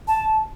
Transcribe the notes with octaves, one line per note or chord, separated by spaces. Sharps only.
A5